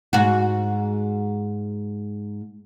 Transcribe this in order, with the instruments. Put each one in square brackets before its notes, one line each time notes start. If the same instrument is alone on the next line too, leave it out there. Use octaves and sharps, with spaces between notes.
[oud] G#2 F#4